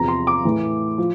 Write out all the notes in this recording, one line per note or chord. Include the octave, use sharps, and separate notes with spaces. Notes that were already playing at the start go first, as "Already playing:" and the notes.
Already playing: E2 C3 F3 A#5
C6
D6
A2 E3
F3